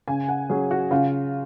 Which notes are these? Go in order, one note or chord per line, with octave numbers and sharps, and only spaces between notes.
C#3 G#5
F#5
F#3 C#4 G#4
F#4
C#3 F4